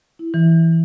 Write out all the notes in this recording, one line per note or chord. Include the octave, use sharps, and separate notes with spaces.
E4
E3